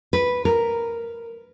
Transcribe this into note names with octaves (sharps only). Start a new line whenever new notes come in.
B4
A#4